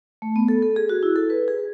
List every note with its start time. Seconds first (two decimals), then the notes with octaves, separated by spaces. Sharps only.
0.22 A3
0.36 B3
0.48 A4
0.62 A4
0.76 G#4
0.89 F#4
1.03 E4
1.16 A4
1.30 B4
1.48 G#4